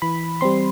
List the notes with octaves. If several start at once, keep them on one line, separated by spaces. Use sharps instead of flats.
E3 B5
G3 C4 C6